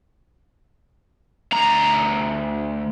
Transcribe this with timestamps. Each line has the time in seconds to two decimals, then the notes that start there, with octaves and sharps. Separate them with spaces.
1.53 D2 A#5